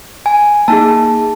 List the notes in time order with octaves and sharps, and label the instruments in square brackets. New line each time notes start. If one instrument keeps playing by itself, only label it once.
[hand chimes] G#5
A#3 D#4 G#4 A5